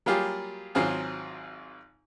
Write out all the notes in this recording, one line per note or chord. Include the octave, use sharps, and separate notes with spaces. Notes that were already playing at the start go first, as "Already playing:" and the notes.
F#3 G3 A#3 F4 G4 G#4
G#1 F#3 C4 F4 G#4